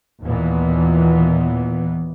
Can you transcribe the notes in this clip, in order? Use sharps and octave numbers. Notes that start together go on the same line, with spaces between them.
D#2 A#2 E3 B3